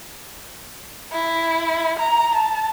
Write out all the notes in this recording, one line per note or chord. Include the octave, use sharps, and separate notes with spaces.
E4
A#5
A5